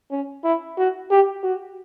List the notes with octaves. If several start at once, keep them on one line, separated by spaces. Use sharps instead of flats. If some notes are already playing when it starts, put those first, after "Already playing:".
C#4
E4
F#4
G4
F#4